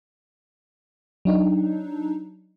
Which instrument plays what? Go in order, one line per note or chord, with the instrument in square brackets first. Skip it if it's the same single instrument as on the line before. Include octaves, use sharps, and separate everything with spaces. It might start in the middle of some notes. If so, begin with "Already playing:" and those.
[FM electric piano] F#3 D4 D#4